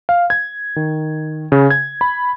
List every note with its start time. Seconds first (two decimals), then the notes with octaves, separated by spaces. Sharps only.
0.09 F5
0.30 G#6
0.76 D#3
1.52 C#3
1.70 G#6
2.01 B5